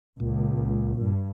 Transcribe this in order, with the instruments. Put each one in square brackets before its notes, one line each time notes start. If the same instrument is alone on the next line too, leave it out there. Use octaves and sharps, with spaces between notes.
[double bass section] C#2 [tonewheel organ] A#2
[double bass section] G2